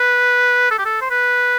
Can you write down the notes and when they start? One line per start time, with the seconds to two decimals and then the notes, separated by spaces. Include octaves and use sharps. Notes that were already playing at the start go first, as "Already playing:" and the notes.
Already playing: B4
0.70 A4
0.78 G4
0.85 A4
1.01 C5
1.10 B4